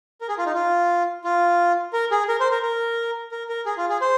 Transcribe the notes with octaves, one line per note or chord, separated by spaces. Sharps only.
A#4
G#4
F4
D#4
F4
F4
A#4
G#4
A#4
C5
A#4
A#4
A#4
A#4
G#4
F4
G#4
C5